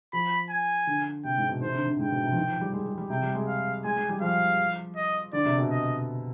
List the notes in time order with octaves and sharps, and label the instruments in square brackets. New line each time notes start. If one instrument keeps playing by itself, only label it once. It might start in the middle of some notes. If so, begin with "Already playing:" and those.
[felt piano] F3 [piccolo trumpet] B5
[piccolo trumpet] G#5
[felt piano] D3
[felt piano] C3 [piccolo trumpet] G5
[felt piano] G#2
B2
[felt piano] D#3 [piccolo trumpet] C5
[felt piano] C3
D3
D3
[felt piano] G#2 [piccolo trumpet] G5
[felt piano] B2
C3
F3
D#3
F3
G3
G#3
G3
G3
[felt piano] C3 [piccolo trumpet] G5
[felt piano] G3
G#3
[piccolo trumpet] F5
[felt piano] G#3 [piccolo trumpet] G#5
[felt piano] G#3
G3
[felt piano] F3 [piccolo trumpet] F5
[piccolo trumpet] D#5
[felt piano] D3 [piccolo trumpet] D5
[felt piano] C3
B2
[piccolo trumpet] D#5